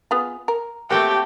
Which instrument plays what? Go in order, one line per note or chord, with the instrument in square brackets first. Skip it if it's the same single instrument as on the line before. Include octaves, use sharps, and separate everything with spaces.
[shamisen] B3 F4 G#4
A#4
[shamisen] F3 A#3 [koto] A3 C4 F#4 [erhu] G4